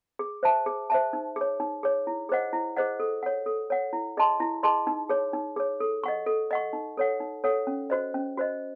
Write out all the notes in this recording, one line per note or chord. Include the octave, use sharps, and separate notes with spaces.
G#4
C5 E5 A5
G#4
C5 E5 A5
D#4
G#4 C#5
D#4
G#4 C#5
E4
G#4 C5 D#5 F#5
E4
G#4 C5 D#5 F#5
A4
C#5 F#5
A4
C#5 F#5
E4
G#4 D#5 A5 C6
E4
G#4 D#5 A5 C6
D#4
G#4 C#5
D#4
G#4 C#5
A4
D#5 F#5 C#6
A4
D#5 F#5 C#6
D#4
A4 C#5 F#5
D#4
A4 C#5 F#5
C#4
F#4 C5 D#5
C#4
F#4 C5 D#5